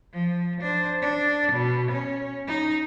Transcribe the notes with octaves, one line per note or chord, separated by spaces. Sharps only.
F3
D4 C5
D4
B2
C#4
D#4